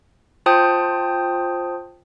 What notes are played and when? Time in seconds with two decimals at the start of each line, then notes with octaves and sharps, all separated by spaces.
0.46 F4 C5 G5 A5 D#6 G6